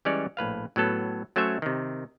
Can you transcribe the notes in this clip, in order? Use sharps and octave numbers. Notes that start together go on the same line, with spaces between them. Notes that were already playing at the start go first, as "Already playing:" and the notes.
E3 G3 G#3 C#4 C#5 D5
A#1 A2 B4 F5
A2 F#3 B3 A4
F#3 A3 C#4 C5 C#5 E5
C3 D#3